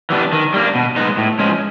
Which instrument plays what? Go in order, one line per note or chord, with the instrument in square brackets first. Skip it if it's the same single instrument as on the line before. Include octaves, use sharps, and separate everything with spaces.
[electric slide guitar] E3 G3 B3 D4
D#3
G3 A#3 D4
B2
G#3 B3 D#4
A2
F3 G#3 C#4